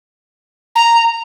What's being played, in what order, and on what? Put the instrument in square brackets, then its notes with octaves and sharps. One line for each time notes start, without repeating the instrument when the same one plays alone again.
[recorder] A#5